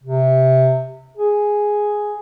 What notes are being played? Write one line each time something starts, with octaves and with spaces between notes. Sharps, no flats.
C3
G#4